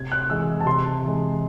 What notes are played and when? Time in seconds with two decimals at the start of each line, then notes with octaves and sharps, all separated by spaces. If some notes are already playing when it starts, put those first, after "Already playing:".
Already playing: C3 G#6
0.12 F#6
0.30 E3 G#3 E6
0.61 A5
0.66 C3 C6
1.03 E3 G#3